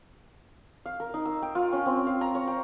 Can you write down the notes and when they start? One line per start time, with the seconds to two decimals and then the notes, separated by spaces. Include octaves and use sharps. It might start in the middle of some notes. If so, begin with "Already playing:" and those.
0.86 F5
1.00 A#4
1.14 D#4
1.25 E6
1.42 G5
1.55 F4
1.73 C#4
1.86 C4
2.06 F5
2.21 A#5
2.35 C#5
2.48 G5